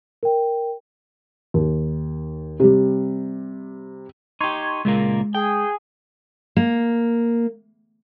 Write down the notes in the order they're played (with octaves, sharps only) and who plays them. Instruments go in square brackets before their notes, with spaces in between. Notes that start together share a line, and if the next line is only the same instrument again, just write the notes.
[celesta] A#4 G5
[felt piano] D#2
C3 G3
[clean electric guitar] D#4 G4 [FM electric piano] C6 C#6 G#6
[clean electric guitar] C#2 A#2 A#3 [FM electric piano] G#3
[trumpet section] G#4 [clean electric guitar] G5
[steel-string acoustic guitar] A#3